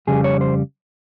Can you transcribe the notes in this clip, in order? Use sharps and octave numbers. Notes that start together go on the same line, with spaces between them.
F2 C#3 G3 G#4
C#5
C5